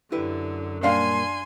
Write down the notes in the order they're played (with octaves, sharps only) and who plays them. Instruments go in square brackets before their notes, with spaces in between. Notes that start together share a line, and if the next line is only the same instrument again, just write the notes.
[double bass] F#2 [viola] D3 [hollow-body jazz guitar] E4 G4 B4
[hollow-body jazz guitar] A#2 G3 A#3 [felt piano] D4 F5 [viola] G#5 C6